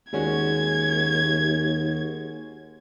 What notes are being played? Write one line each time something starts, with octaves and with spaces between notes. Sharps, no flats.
D#2 G#3 C#4 F#4 G#6